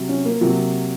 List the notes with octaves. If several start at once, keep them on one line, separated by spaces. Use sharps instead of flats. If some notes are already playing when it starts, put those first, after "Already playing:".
Already playing: C3 F#3
C#4
A#3
C3 F#3